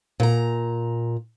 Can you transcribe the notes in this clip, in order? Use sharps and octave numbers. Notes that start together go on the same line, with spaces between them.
A#2 A#5